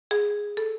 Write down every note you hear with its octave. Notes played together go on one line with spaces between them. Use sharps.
G#4
A4